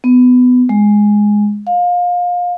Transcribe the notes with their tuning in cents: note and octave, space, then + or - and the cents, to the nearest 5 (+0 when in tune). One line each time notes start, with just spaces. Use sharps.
B3 +20
G#3 +0
F5 +25